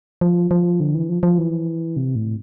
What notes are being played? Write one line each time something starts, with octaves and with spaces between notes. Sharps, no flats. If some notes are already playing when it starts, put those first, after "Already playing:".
F3
F3
D3
E3
F3
F3
E3
C3
A2